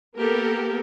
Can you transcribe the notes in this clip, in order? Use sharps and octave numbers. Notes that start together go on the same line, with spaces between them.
A#3 B3 G4 A4 A#4